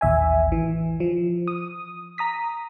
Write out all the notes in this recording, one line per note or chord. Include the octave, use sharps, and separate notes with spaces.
A1 D#2 E5 G#5
E3
F3
D#6
A#5 D#6 B6